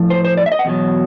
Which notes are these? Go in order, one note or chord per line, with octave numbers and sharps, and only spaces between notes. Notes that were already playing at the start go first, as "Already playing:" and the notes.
Already playing: A2 F3
C5
C5
D5
E5
D#5
F#5
E2 B2 F#3